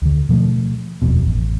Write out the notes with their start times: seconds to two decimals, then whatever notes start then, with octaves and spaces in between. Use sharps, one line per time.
0.02 D2 D3
0.29 B2 F3 F#3 A3
1.02 D#1 A#1 F2 B2
1.26 A1